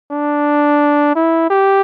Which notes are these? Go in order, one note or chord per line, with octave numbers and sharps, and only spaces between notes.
D4
E4
G4